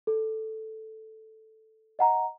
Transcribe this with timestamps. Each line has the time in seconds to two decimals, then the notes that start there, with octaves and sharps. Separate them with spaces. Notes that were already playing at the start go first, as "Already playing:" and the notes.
0.07 A4
1.99 D#5 F#5 A#5